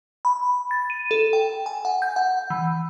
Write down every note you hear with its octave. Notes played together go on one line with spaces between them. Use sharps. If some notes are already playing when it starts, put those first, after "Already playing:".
B5
A6
D#7
A4
G5
G#5
F#5
G6
F#5
E3